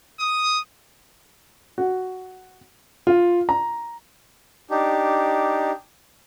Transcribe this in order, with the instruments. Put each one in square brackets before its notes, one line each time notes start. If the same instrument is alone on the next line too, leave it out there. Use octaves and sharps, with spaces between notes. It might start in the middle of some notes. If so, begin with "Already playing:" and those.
[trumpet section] D#6
[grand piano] F#4
F4
A#5
[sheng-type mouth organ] D4 D#4 G4